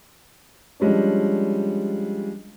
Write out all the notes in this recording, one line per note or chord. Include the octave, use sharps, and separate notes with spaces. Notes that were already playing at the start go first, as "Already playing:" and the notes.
F3 G3 G#3 C#4 D4